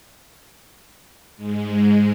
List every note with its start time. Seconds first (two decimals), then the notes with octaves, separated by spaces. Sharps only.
1.36 G#2 G#3